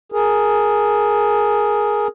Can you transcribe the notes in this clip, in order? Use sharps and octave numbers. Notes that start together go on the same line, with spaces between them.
G#4 A#4